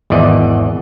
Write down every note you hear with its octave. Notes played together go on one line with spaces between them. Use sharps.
G#1 E2 E3 D5 D#5